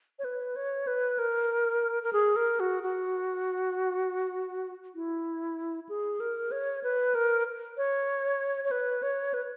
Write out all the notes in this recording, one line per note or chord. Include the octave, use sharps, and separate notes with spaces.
C#5
B4
C#5
B4
A#4
A#4
G#4
A#4
F#4
F#4
E4
G#4
A#4
C#5
B4
A#4
C#5
C#5
B4
C#5
B4